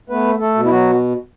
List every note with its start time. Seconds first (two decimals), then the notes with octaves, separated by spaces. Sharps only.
0.09 A3 B3 B4
0.39 A3 A4
0.55 B2
0.65 E4
0.70 F#3 F#4